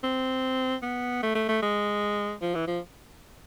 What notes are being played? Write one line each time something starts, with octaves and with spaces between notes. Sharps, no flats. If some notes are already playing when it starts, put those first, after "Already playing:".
C4
B3
A3
A3
A3
G#3
F3
E3
F3